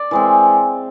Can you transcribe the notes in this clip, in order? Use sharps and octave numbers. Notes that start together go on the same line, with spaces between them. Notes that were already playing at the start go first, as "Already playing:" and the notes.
Already playing: D5
E3 G#3 C4